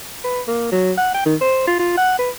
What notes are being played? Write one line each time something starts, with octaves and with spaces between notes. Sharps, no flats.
B4
A#3
F#3
F#5
G5
D#3
C5
F4
F4
F#5
B4